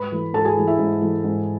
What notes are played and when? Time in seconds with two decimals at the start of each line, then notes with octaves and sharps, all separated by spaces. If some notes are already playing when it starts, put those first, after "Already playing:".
Already playing: G#2 B4 B5
0.12 E3 A3
0.34 G#2 A4 A5
0.45 G#4 G#5
0.56 E3 A3
0.67 E4 E5
0.79 G#2
1.01 E3 A3
1.24 G#2